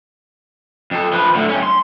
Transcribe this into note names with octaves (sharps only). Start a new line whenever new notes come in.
F2 A4
F3 B4
A2 D3
G2 C#4
C6